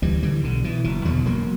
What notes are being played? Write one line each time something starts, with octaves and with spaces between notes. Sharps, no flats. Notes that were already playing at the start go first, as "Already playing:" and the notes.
D2 E3 G3
D3 E3 G3
B1 D3
B2 E3
F#1 E3
E2 B2 D3 F#3
E1 F#3 A#3